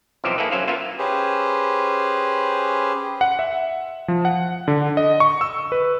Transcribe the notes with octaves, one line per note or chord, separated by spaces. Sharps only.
B1 C3 E3 F3 G4 C5
A#3 E4 G#4 A4 B4
F#3 C#4 C5 F5
A#3 B3 F4 E5 F5
C#4 G4 G#4 B4 C5
F#5
E5
F3
F#5
D3
D#5
C#6
E6
B4